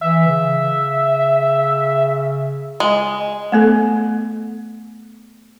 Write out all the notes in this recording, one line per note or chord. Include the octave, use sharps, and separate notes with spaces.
E3 E5
C#3
G#3
A3 B3 A4